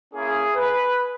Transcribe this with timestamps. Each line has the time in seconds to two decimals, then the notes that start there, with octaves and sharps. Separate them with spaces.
0.13 A#3 C#4 E4 G#4
0.56 B4